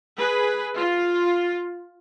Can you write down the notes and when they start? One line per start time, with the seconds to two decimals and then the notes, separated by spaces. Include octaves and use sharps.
0.17 G#4 B4
0.76 F4